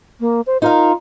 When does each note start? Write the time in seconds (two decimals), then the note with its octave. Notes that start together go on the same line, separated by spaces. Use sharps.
0.20 A#3
0.47 C5
0.62 D#4 F4 A#4 F5